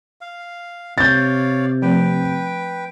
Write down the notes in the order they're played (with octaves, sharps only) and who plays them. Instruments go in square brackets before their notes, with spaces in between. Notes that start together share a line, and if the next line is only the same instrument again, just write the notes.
[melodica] F5
[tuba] C3 [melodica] C#5 D5 F5 [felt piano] G6 A6
[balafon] F3 A3 C4 [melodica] B4 G5